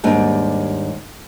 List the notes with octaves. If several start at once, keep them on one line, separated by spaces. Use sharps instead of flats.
D#2 G#2 G3 D4 G#4